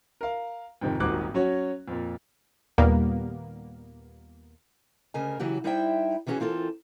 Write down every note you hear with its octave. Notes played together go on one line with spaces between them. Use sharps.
A#4 F5
F2 G#2 C3 D#3
D#1 G#1 G#2 F#4 D6 F#6
F#3 C#4 F#4 C#5
F2 A#2
D#2 A#2 G3 A#3 B3
D2 C#3 A#4 D#5 G#5
C#3 E3 F#3 F#4 G4
G3 D#4 E4 C5 E5 G5
D#3 E3 C#4 F4 F#4 G#4
E3 C4 F4 A4 A#4